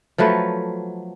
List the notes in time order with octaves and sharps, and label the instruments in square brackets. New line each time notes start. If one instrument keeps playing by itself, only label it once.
[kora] F3 F#3 A3 B4